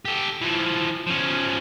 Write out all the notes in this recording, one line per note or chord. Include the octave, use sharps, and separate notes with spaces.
G4 A4
E3 F3
F3 C#4